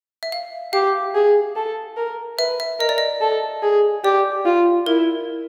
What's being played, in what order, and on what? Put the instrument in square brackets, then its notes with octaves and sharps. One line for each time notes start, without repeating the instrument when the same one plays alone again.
[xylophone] E5
F5
[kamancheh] G4 [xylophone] F5
[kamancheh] G#4
A4
A#4
[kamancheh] B4 [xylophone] E5
[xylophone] E5
[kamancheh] A#4 [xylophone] D#5
[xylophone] D5
D#5
[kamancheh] A4
G#4
[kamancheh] G4 [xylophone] D5
[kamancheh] F4
[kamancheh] E4 [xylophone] A#4